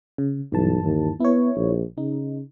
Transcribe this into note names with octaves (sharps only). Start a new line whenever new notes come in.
C#3
B1 G2 E3 A5
D#2
B3 E4 C#5
A#1
C#3 D#4